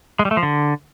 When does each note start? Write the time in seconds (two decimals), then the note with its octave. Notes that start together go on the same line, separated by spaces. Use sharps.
0.19 G#3
0.25 G3
0.31 A3
0.37 F3
0.43 D3